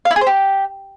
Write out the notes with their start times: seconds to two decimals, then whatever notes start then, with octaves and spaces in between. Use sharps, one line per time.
0.05 F5
0.11 E4
0.16 G#4
0.21 C5
0.27 G4